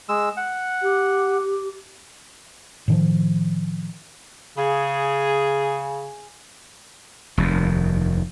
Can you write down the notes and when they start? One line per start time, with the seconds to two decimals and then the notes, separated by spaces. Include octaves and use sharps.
0.09 G#3 E6
0.37 F#5
0.83 G4
2.88 A2 D#3 F3
4.57 C#3 G#4
7.38 F1 D#2